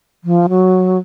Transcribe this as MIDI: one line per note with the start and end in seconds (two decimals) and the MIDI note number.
0.24 0.47 53
0.49 0.98 54